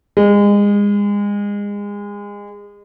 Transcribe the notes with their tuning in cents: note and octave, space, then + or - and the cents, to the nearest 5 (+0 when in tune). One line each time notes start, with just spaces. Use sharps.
G#3 -30